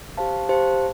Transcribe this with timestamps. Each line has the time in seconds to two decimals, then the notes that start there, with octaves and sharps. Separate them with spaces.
0.17 G4 C5 F5 A5
0.49 G4 C5 F5 A5